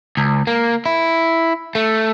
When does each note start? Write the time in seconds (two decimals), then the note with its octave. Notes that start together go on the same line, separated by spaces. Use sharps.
0.17 C#2
0.47 A#3
0.86 E4
1.75 A3